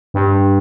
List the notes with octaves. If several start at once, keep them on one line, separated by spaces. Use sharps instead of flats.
G2